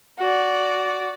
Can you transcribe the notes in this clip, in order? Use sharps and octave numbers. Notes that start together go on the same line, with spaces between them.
F#4 D5